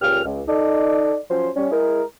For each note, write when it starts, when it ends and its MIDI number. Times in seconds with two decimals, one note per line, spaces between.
0.02 0.24 37
0.02 0.24 46
0.02 0.24 61
0.02 0.24 67
0.02 0.24 89
0.24 0.41 37
0.48 1.16 63
0.48 1.16 69
0.48 1.16 74
1.31 1.49 53
1.31 1.49 54
1.31 1.49 61
1.31 1.49 72
1.56 1.69 55
1.56 1.69 61
1.71 2.02 56
1.71 2.02 64
1.71 2.02 68
1.71 2.02 70